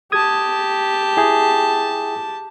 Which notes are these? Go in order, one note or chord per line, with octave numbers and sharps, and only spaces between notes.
G4 A5 D#6 G#6
E4 G#4 G5